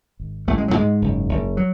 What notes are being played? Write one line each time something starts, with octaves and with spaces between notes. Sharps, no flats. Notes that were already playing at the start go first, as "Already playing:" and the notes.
G#1
A1 A3
G#3
F#3
G#2 G#3
F#1
F#1
F#3